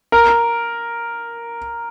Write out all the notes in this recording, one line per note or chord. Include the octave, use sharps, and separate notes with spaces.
A#4